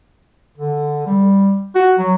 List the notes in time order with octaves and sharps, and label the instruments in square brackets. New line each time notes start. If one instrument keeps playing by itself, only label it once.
[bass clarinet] D3
G3
F#4
F#3